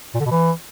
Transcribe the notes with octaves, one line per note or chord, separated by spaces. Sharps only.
A#2
D3
B2
E3